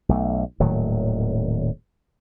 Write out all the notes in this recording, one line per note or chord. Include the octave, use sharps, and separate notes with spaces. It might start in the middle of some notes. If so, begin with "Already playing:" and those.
B1 A3
D#1 A2 D#3 F#3